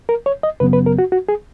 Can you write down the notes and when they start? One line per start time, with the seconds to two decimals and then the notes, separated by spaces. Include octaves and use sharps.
0.09 A#4
0.26 C#5
0.43 D#5
0.60 F#2 C#3 F#3 B3 B4
0.73 B4
0.86 A#4
0.99 F#4
1.12 F#4
1.29 G#4